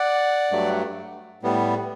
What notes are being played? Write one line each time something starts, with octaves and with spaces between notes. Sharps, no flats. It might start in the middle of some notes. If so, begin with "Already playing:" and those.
Already playing: D5 F#5
G2 F#3 A3
A2 G3 B3